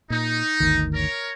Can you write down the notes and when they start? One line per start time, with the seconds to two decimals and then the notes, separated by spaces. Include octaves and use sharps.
0.10 A#2 D#4
0.60 G1 D2 D#3
0.94 A#4 C#5